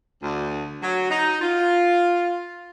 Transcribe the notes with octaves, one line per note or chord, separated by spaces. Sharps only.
D2
F#3
D#4
F4